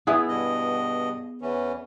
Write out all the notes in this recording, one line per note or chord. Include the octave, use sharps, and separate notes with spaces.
B3 E4 G#4
G2 B2 D#5
E2 E3 C#4